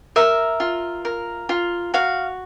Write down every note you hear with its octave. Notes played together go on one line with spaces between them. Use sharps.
A#4 E5
F4
A#4
F4
F#4 F5